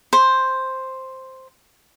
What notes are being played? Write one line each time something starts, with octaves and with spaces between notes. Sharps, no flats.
C5